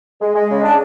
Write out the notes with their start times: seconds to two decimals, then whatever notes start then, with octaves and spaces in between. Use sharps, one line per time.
0.22 G#3
0.36 G#3
0.51 C#3
0.64 D4